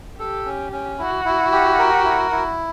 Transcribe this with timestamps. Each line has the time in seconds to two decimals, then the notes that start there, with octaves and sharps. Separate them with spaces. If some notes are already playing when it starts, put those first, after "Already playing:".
0.19 G4 A4
0.46 C#4
0.72 C#4
0.99 E4 F#4
1.25 E4
1.52 G4
1.79 A#4
2.05 E4
2.31 E4